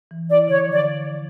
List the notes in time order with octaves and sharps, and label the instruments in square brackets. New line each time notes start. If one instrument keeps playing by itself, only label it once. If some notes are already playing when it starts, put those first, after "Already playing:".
[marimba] E3
[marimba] E4 [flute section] D5
[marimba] D3 [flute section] C#5
[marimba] F3
[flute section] D5